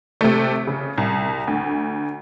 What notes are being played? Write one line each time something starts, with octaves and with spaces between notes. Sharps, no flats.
C3 A3
C#3
C2
D2